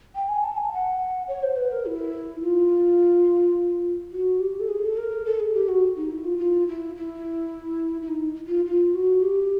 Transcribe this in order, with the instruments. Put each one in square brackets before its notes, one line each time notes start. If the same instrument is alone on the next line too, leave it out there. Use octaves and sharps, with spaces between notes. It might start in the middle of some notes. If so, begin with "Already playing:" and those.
[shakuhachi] G5
G#5
A5
G#5
F#5
C#5
C5
B4
A#4
E4
F4
F#4
G4
A4
G#4
A4
A#4
A4
G#4
G4
F#4
D#4
E4
F4
F4
E4
E4
E4
D#4
F4
F4
F#4
G4